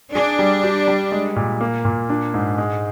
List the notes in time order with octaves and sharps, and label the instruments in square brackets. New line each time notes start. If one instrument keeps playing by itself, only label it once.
[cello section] D4 [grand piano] G#4
[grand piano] G3
G4
G3
G#3
A#2
A#3
A#2
D4
G#2
G#3